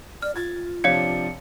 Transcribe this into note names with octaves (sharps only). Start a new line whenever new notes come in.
D5 F6
F4 G#6 A6
C3 F3 D4 C#5 F5 G#6 C#7